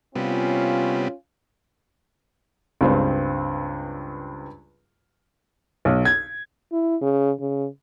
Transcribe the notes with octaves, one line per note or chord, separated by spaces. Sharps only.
C3 G3 B3 C#4 F4
C#2 G2 C4
B1
G#6
E4
C#3
C#3